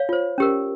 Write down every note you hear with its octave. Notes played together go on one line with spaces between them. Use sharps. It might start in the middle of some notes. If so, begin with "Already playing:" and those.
Already playing: C#5 F5
F4 C5
C#4 G4 A#4